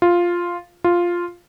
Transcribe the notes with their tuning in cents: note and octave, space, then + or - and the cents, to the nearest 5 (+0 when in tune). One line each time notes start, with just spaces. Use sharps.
F4 +0
F4 +0